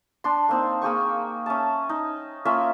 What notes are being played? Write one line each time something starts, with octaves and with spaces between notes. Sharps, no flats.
D4 C6
A#3 C4 D#4
A#3 G#4 G5 C#6
C#4 E5 A5
D#4
A#3 C#4 F4 E5